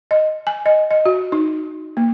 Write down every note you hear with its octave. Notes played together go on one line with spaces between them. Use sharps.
D#5
G#5
D#5
D#5
F#4
D#4
A#3